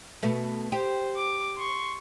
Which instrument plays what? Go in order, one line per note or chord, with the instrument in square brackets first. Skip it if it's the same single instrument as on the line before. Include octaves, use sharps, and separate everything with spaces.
[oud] B2 A3
[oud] G4 [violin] C5
[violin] D6
C6 C#6